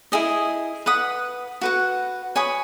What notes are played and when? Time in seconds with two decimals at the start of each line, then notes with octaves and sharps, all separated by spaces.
0.12 E4 G#4 D#5
0.86 B4 F#5 B5 D#6
1.61 F#4 B4 F#5
2.36 C#5 G#5 B5 D#6